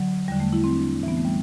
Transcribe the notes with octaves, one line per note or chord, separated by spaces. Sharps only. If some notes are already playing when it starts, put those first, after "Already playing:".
Already playing: D3 F#3
E2 D3 G3
A3
E4
C4
D4
A2 E3 B3 C4
A3
G3